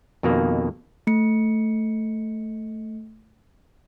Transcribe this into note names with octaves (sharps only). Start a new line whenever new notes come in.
F2 B2 D#3 A#3
A3 C#7